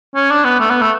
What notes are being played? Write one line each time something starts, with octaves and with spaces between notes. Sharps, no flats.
C#4
D4
B3
A3
B3
A3